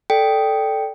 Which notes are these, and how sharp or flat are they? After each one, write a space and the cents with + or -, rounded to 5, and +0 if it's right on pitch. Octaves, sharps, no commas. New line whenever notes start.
A4 +0 D5 +0 G5 +0